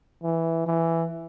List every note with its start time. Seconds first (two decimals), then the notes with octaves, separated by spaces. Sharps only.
0.23 E3
0.67 E3